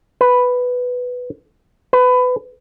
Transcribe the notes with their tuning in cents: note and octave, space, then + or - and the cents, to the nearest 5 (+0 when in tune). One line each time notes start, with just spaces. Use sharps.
B4 +5
B4 +25